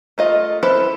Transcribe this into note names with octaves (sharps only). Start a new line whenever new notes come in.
A3 F4 D#5
E4 A4 B4 C5